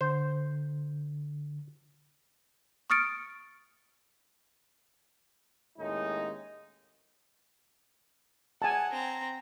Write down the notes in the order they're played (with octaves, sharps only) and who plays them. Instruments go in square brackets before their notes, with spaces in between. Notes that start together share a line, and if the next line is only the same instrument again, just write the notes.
[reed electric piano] D3 [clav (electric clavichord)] C5
[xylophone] C#6 D#6 F6 A6 C#7 D7
[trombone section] D#2 A2 G#3 C#4 D#4
[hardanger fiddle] F#5 [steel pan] G#5 A5
[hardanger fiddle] C4 A#5